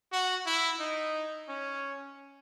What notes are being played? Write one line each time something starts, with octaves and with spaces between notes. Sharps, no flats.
F#4
E4
D#4
C#4